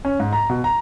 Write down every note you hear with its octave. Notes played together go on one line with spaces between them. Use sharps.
C#4
G#2
A#5
B2
A#5